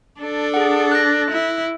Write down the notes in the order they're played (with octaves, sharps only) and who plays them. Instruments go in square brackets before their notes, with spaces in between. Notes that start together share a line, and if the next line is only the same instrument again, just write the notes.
[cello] D4 A4
[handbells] G#4 F#5
F#6 A#6
[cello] E4